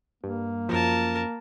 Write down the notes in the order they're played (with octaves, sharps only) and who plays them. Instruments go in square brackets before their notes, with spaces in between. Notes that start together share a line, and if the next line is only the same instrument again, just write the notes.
[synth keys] G2 [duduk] A#3
[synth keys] F#2 F3 [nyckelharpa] A#4 A5